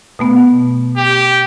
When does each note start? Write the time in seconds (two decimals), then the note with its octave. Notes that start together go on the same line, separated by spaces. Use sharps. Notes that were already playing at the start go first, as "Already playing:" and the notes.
0.19 B2 A3 B3
0.97 G4